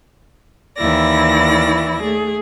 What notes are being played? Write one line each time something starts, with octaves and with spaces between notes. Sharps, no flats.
D#2 E3 E4 D5 A#6
A3 G#4